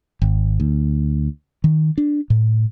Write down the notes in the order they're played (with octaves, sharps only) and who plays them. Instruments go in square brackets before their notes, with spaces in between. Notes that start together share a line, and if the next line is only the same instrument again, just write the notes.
[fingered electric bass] G#1
D2
D#3
D4
A2